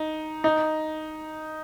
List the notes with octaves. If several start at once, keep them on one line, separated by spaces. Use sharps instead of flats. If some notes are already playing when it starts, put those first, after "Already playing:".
Already playing: D#4
D#4